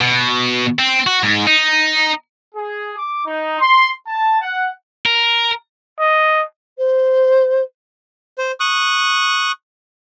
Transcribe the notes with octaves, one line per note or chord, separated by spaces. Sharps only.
B2
C4
F#4
G#2
D#4
G#4
D6
D#4
C6
A5
F#5
A#4
D#5
C5
C5
C#6 D#6 F#6